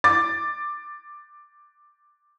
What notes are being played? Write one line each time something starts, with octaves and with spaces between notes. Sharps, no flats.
D6 A6